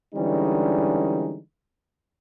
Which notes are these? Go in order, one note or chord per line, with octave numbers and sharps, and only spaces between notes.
D3 E3 G3 G#3 C#4 D#4